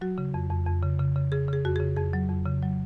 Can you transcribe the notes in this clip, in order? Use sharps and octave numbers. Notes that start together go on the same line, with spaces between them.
F#3 F#4
C#3
F2
F2
F2
C#3
C#3
C#3
C#3 G#4
C#3 G#4
F2 F#4
C#3 G#4
F2 G#4
F#3
F2
C#3
F#3